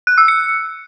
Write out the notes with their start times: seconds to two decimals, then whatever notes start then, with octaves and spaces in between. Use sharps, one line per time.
0.07 F#6
0.18 E6
0.28 C#7